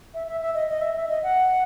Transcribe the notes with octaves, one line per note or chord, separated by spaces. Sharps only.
E5
E5
E5
D#5
D#5
E5
E5
D#5
F#5